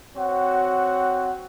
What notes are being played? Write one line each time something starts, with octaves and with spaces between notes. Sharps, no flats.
C4 F#4 C#5 F#5